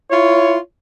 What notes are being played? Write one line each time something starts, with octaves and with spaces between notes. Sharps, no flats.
E4 F4 C#5